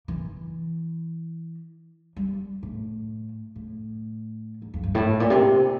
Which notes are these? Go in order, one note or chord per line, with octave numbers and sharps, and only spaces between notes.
E3
G3
A2
A2
E2
F2
G2
A2
A#2
C3